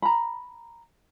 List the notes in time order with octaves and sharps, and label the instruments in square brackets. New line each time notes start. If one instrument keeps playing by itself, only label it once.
[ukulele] A#5 B5